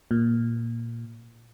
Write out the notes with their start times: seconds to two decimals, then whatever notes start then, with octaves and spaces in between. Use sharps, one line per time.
0.11 A#2